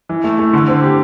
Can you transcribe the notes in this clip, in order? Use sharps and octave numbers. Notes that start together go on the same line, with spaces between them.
E3
A3
A3
D3
C4
G4